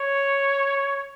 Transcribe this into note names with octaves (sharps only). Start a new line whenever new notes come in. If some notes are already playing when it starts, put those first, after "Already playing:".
Already playing: C#5